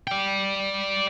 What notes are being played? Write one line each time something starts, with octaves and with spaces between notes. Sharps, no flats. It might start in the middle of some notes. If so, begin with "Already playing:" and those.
D5 G5